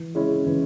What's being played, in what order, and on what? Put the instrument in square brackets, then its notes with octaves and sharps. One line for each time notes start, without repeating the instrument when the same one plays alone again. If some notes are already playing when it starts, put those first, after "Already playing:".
Already playing: [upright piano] E3
G#3 C#4 E4
E3